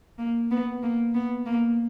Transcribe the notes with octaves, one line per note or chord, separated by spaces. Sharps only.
A#3
B3
A#3
B3
A#3